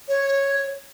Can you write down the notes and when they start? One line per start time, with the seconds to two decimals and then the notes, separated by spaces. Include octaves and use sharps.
0.08 C#5